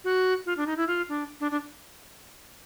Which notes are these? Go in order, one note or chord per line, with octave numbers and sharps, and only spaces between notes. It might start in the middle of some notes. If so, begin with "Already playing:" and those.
F#4
F4
D4
D#4
E4
F4
D4
D4
D4